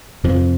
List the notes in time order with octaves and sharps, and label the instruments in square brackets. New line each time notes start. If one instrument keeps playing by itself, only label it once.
[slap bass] F1 F2 F3